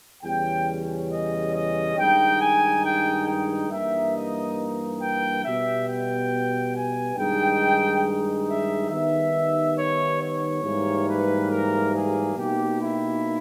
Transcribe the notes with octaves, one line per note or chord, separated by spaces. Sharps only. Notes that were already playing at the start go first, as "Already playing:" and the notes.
E2 C#3 G3 C#4 G5
D#5
D#5
G2 D#3 G#3 D#4 G5
G#5
G5
G5
G2 E3 A#3 D#4 E5
D#5
G5
B2 G3 B3 E5
G5
G#5
G2 D#3 G#3 D#4 G5
E5
D#3 G3 B3 D#4 E5
C#5
C#5
G#2 E3 G3 A#3
B4
A#4
G#4
B2 A#3 D#4 G4
E4